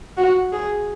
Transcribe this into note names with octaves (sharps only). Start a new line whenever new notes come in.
F#4
G#4